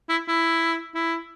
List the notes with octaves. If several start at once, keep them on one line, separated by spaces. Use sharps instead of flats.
E4
E4
E4